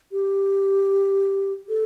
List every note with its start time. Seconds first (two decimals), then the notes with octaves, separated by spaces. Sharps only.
0.12 G4
1.69 A4